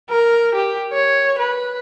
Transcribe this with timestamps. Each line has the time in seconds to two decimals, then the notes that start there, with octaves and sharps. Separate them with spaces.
0.10 A#4
0.55 G4
0.93 C#5
1.39 B4